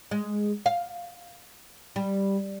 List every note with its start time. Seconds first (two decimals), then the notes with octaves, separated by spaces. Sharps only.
0.11 G#3
0.66 F5
1.96 G3